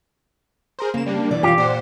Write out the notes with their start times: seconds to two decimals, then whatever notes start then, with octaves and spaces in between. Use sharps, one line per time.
0.79 G#4 A#4 C5
0.94 C#3 A#3 E7
1.06 G3 A#3 D4
1.31 B2 E3 D5
1.43 F4 G4 C#5 F5
1.58 A#2 C5 D5 F#5